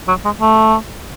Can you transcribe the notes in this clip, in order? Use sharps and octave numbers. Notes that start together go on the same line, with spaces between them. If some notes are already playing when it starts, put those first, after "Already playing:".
F#3
G#3
A3